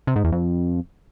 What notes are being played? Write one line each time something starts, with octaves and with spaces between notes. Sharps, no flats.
C3
G#2
E2
F2